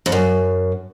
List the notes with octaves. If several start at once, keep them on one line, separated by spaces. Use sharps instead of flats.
F2
F#2